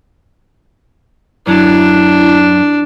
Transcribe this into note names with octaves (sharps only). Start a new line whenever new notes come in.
F#2 F#3 D4 E4